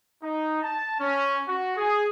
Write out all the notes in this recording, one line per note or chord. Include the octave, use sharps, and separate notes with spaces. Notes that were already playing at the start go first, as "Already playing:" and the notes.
D#4
A5
C#4
F#4
G#4